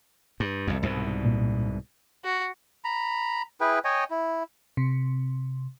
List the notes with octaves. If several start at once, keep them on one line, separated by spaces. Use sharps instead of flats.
G2
C2 F2
C2 G#2 B2
A#2
F#4
A#5 B5
E4 G#4 B4 G5
C#5 D#5 G5 G#5
E4
C3